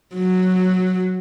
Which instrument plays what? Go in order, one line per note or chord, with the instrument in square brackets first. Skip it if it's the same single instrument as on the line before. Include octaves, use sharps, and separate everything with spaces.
[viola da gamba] F#3